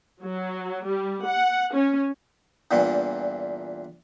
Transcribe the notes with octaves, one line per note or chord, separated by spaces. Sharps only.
F#3
G3
F#5
C#4
E2 G2 A#2 E3